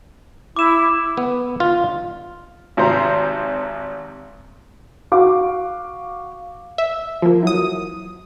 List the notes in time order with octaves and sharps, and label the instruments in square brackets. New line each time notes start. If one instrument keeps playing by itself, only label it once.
[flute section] E4 [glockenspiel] D6 E7
[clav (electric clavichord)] B3
F4
[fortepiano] G#1 C3 C5 A#5
[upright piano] F#4 F5 D6
[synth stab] E5
F3 A#3
E3 F#3 D#6